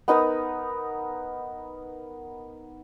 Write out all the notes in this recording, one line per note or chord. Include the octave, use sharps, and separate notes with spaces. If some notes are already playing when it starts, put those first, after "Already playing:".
B3 D#4 A#4 D#6